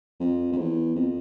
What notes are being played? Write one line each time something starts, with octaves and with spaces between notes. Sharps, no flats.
F2
F2
E2
F2